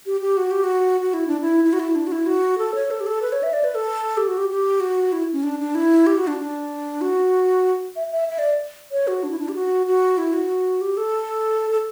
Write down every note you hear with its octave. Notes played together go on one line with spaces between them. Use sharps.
G4
G4
F#4
G4
F#4
F#4
E4
D4
E4
E4
F#4
E4
D4
F#4
E4
F#4
A4
C#5
A4
G4
A4
B4
C#5
E5
D5
B4
A4
G4
F#4
G4
G4
F#4
E4
C#4
D4
D4
E4
G4
F#4
D4
D4
F#4
E5
E5
E5
D5
C#5
F#4
D4
E4
D4
G4
F#4
F#4
E4
F#4
G4
A4
A4